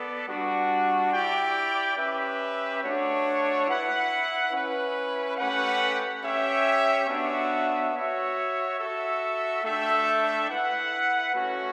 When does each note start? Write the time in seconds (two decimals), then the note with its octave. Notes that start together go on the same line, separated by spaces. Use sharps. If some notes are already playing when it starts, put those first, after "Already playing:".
Already playing: B3 A4 D5
0.26 G3 D4 F#4
1.12 E4 G4 D5 G5
1.96 C#4 G4 B4 E5
2.82 A3 D4 F#4 C#5
3.67 E4 B4 F#5
4.52 C#4 E4 B4
5.37 A3 C#4 G4 B4 F#5
6.23 C#4 G4 C#5 E5 G5
7.07 B3 D4 F#4 C#5 E5
7.92 F#4 C#5 E5
8.78 F#4 A4 E5
9.62 A3 D4 A4 E5 G5
10.48 E4 B4 F#5
11.33 A3 C#4 F#4